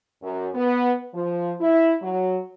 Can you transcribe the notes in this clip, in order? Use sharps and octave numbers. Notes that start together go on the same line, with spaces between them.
F#2
B3
F3
E4
F#3